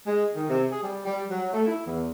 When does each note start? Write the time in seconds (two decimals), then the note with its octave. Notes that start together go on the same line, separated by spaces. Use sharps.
0.07 G#3
0.34 D#3
0.49 C3
0.71 G#4
0.83 G3
1.06 G3
1.29 F#3
1.53 A3
1.66 E4
1.86 E2